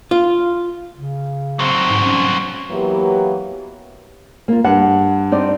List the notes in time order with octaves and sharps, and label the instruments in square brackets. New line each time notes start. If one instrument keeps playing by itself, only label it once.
[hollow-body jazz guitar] F4
[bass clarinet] C#3
[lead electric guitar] F#3 C4
[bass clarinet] G#2
C#4
[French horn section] E3 F#3 A#3 B3 G4
[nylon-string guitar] A#3 F4
[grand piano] G2 [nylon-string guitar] F#5
[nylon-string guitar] C4 D#4 D5